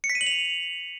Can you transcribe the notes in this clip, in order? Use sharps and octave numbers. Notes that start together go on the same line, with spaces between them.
C#7
B6
D#7
F#7
F7